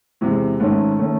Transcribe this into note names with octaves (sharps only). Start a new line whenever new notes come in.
E2 C3 E3 G#3
G#2 D#3 A3 C#4
D#3 A3 C#4